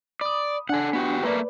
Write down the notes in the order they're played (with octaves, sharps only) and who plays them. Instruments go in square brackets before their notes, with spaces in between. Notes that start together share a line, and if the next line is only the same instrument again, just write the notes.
[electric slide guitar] D5 [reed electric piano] B5 D#6
[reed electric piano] D4 G#5 [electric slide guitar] A4 F#5
[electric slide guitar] B3 F#4 G4
[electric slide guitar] A3 A#3 [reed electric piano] B4 D5